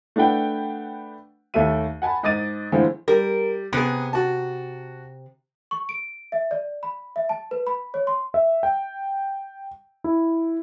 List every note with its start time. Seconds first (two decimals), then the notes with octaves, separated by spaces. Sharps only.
0.16 A3 D4 B4 F#5 G5
1.54 D#2 A3 A4 E5 D#7
2.02 F#5 G#5 A5 B5
2.23 G#2 D#5 D6 A6 D#7
2.72 D3 E3 F3 G#3 A3 C4
3.08 G3 A#4
3.73 C3 B3 G#4
4.13 F#4 A5
5.71 C#6
5.89 D7
6.32 E5
6.51 D5
6.83 B5
7.16 E5
7.29 A5
7.51 B4
7.67 B5
7.94 C#5
8.07 C6
8.34 E5
8.63 G5
10.04 E4